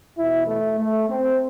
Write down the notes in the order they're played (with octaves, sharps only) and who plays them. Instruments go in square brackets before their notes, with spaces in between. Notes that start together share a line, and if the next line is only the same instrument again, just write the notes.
[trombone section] E2 B2 E4
A3
A3
C4